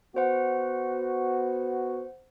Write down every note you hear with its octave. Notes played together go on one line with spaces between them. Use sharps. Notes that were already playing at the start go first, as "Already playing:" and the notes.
B3 F#4 C5 F#5